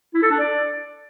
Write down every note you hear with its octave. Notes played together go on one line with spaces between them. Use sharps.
E4
A4
D4
D5